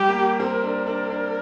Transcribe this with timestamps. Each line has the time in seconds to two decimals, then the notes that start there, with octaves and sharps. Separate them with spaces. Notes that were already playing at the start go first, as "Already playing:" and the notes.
Already playing: G3 G4
0.08 A#3
0.39 C4 A#4
0.64 D4
0.87 D4
1.10 D4